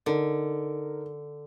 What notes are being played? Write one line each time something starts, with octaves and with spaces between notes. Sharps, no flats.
D3 D#4 A#4